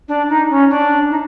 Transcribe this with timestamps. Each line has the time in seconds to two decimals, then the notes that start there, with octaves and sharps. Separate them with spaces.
0.08 D4
0.29 D#4
0.50 C#4
0.70 D4
1.10 D#4